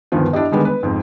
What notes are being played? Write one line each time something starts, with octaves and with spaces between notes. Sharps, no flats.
D2 G2 D#3 F3 B3
D4 E4 G4 D#5
D3 D#3 G3 G#3 B3
B4
F2 G#2